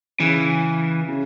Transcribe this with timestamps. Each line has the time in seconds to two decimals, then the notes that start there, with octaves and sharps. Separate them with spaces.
0.19 C#3 E3
1.09 C#3